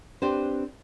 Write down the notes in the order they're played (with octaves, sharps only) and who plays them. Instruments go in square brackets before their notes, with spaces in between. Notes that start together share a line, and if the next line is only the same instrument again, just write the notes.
[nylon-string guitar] C4 D4 G4 B4 C5